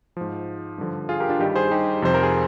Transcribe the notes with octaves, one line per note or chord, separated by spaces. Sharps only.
G#2 F3
G2 D3 F3
F4 G#4
G4 A#4
D4 F4
G2 D#3 G3 D#4 G4
G#4 C5
D#4 G4
F2 C3 F3 C5
A#4
G#4